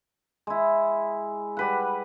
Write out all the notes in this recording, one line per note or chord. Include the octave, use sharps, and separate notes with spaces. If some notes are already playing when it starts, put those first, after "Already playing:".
G#3 E4
G3 B4 F#5